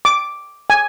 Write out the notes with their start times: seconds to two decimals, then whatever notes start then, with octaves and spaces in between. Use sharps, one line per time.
0.05 D6
0.70 G#5